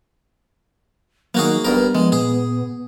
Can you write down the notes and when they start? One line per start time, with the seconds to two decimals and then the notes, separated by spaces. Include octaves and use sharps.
1.35 D#3 F#3 A#3 F#4 G#4
1.65 D#1 G2 B3 A#4
1.95 F3 G#3
2.12 A#2 G#4